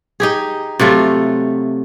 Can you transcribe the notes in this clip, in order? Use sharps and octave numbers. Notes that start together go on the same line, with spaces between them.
D#4 G4 G#4
C3 F#3 A3 F4